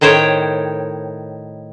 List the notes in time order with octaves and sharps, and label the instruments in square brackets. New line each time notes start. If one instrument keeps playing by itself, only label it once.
[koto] A2 D#3 C5 C#5 G5